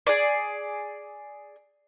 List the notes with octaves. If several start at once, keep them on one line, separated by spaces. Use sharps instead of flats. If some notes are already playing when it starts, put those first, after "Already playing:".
G#4 D5